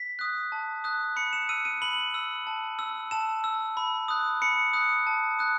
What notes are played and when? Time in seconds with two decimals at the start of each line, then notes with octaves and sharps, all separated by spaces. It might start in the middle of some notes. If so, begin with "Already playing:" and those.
Already playing: B6
0.19 D#6 F#6
0.52 A5
0.84 D#6 F#6
1.16 B5 C#7
1.33 E7
1.49 E6 D#7
1.65 D#7
1.82 B5 F#7
2.14 E6
2.47 A5
2.79 E6
3.11 A5 E7
3.44 E6
3.77 B5
4.08 D#6 F#6
4.42 B5 C#7
4.73 D#6 F#6
5.07 A5
5.39 D#6 F#6